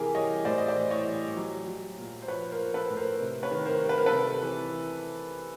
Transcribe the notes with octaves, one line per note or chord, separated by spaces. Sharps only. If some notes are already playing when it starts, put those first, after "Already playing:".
Already playing: C3 E3 G4 G#4 A#4
G3 C#5 D#5
A2 C5 D5
D#5
C5 D5
E3
C#5 D#5
G3
F#3
F#3
A#2
C5
F3 B4 C#5
A#4 C5
F3
A4 B4
A2
A#4 C5
C3
B4 C#5
D#3
A#4 C5
G3
B4
A#4
A4 B4
C3
E3